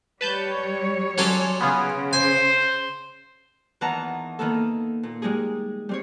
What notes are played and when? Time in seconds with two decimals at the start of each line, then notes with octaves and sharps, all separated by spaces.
0.21 G3 B4 C#5 A5 G6
1.18 F#3 C#4 A4 G#5 C6 D6
1.61 C#3 B3 F4 G#4
2.13 C5 G#5
3.81 E2 D#3 B3 F#5 A5 A#5
4.39 D#3 A#3 B3 A4
5.03 A#2
5.22 G3 G#3 D#4 G#4
5.89 G3 C4 C#5